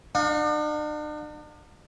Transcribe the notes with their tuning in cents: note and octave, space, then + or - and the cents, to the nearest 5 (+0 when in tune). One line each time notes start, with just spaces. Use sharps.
D4 +45 F5 +45